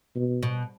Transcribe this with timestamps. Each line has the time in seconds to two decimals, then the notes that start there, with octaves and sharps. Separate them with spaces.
0.15 B2
0.43 B2